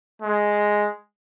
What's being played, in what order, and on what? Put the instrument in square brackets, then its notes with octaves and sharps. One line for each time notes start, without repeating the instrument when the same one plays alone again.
[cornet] G#3